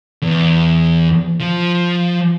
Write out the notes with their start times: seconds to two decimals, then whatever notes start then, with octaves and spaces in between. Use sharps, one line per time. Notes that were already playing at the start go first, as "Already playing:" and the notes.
0.22 E2
1.40 F3